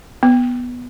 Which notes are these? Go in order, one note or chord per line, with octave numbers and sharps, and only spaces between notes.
B3